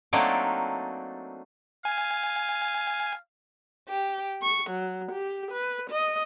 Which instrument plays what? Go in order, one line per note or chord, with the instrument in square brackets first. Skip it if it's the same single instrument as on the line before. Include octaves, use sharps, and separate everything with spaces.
[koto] F#3 A3 A#3 C4 D4 D#4
[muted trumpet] F5 [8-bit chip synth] G#5
[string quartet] G4
C#6
F#3
G4
B4
D#5